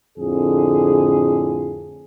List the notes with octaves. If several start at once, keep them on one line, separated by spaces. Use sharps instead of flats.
F2 A2 D3 G#4